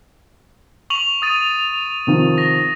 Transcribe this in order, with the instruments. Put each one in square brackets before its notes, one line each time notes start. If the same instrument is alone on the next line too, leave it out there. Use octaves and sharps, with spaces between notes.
[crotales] C#6 F7 F#7
D#6 A6 D#7
[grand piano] C3 D#3 F3
[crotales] A#6